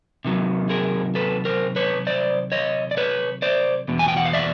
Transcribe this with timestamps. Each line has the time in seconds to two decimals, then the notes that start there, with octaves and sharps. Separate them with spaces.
0.25 C3 D#3 F#3
0.69 G#4 A#4
1.15 A4 B4
1.45 A#4 C5
1.76 B4 C#5
2.07 C5 D5
2.52 C#5 D#5
2.91 D5
2.97 B4 C#5
3.42 C5 D5
3.88 E2 B2
3.99 G#5
4.08 G5
4.17 F#5
4.25 F5
4.33 D5 E5